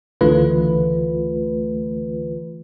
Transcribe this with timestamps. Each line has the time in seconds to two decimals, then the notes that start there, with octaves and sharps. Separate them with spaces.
0.21 C#2 D3 E3 A3 F4 B4